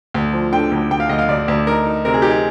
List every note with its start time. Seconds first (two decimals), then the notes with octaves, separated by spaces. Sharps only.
0.14 D2
0.33 F3
0.53 D3 G5
0.71 D2
0.91 D2 G5
1.00 F5
1.09 D2 D#5
1.19 F5
1.29 D2 D5
1.48 D2
1.67 D#4 A#4
1.86 D#4
2.05 C3 A#4
2.14 G#4
2.22 D#4 G4
2.30 G#4